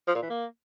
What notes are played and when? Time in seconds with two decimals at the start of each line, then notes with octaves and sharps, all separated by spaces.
0.07 F3
0.15 A#2
0.22 E3
0.30 A#3